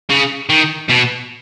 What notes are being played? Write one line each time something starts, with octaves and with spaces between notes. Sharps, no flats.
C#3
D#3
B2